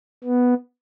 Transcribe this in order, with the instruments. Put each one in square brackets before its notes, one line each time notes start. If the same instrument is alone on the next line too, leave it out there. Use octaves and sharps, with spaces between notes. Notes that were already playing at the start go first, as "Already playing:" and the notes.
[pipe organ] B3